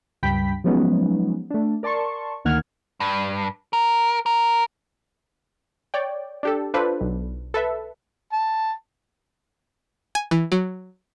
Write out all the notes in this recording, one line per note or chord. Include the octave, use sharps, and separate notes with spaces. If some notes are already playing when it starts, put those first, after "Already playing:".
C#2 G2 G5 B5 B6
F3 F#3 G#3 B3 C#4 D#4
A3 D4
A#4 D5 A5 C6 C#6
D2 D#3 A#3 F#5 F6 G#6
G2
A#4
A#4
C#5 D5 G5
D4 G4 A4
D4 F4 A4 B4 C5
B1
A4 B4 E5
A5
G#5
E3
F#3